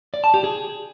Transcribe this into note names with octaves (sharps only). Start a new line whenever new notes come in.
D5
A5
G4
G#4